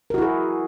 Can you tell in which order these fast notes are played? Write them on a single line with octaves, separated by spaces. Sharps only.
A#4 F#4 E4 G#4